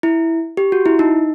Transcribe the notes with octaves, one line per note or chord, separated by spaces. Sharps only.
E4
G4
F#4
E4
D#4